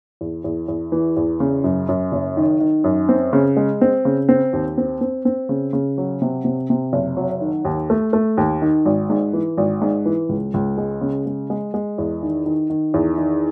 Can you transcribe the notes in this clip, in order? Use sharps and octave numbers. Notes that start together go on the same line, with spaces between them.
E2
E2
E2
E3
E2
C#3
F#2
F#2
F#1
D#3
D#3
F#2
C4
C#3
G#3
C4
C#3
C4
D#2
C4
C4
C4
C#3
C#3
F#3
C3
C3
C3
F#1
F#3
D#3
D#2
A3
A3
D#2
D#3
G#1
G#2
E3
G#1
G#2
E3
C#2
C#2
G#3
C#3
G#3
G#3
G#3
E2
D#3
D#3
D#3
E2
D#3